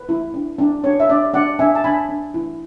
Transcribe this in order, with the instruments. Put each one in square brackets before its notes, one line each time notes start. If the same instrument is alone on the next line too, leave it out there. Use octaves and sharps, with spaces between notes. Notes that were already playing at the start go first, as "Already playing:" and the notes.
Already playing: [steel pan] B4
E4
D4
D4
D4 C#5
E5
D4 D5
D4 D5 F#5
D4 E5 G#5
A5
D4 G#5 B5
D4
E4